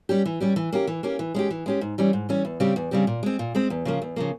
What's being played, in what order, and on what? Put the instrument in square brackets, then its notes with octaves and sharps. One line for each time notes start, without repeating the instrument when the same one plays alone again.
[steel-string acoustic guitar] G3 C#4 G4
E3
G3 C#4 G4
E3
A#3 C#4 G4
E3
A#3 C#4 G4
E3
G#3 C#4 G4
E3
G#3 C#4 G4
G#2
E3 G3 C#4
G#2
E3 G3 C#4
E2
C#3 G3 C4 G4
E2
C#3 G3 C4 G4
A#2
G#3 C4
A#2
G#3 C4
E2
C#3 F3 A#3
E2
C#3 F3 A#3